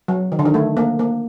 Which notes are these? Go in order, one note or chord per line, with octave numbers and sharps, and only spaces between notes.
F#3
D#3
D3
D#3
A3
A#3
A#3